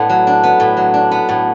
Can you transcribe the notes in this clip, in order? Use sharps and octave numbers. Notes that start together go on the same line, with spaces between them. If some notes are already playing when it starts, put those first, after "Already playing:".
Already playing: A2 B3 D4
F#3
D4
B3
A2
F#3
D4
B3
A2